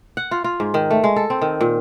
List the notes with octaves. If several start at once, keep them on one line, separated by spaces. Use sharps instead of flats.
F#5
F4
F4
G#2
D#3
A3
G#3
A4
C4
D#3
A#2